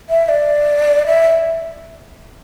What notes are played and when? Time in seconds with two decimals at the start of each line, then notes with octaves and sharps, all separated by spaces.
0.10 E5
0.29 D5
1.06 E5